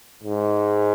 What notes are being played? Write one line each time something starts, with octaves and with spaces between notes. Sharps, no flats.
G#2